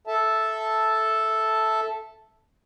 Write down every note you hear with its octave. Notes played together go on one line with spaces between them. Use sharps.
A4 E5 A5